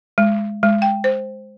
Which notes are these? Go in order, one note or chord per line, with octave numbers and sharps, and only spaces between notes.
G#3
G#3
G5
C5